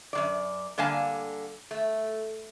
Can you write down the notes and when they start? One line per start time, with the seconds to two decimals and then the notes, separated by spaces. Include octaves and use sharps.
0.13 F#2 D#3 D5
0.78 D3 G3 A#3 F5 G#5 A5
1.71 A3